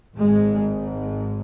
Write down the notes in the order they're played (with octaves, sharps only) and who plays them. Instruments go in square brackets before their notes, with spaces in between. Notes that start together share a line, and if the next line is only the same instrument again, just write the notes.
[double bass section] G#1 G#2 G#3